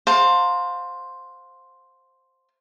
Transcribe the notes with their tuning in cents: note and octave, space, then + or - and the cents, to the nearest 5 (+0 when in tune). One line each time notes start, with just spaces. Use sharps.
C5 +5 F5 +30 A5 +40